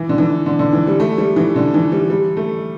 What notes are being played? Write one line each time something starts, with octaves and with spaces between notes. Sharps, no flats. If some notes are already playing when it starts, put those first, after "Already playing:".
Already playing: E3
D3
E3
D3
D3
E3
G3
A3
G3
E3
D3
E3
G3
G3
A3